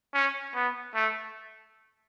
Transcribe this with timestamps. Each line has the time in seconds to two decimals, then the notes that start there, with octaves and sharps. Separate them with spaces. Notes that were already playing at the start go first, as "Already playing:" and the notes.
0.14 C#4
0.55 B3
0.95 A3